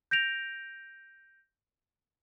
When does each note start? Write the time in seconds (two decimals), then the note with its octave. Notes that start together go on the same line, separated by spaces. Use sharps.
0.11 G6 A#6 D7 F7